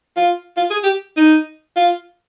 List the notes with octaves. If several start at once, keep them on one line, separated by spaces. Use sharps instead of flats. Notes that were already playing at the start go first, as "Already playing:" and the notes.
F4
F4
G#4
G4
D#4
F4